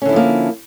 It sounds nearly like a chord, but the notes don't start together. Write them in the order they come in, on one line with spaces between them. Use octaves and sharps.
C#4 D3 E4 F3 A#3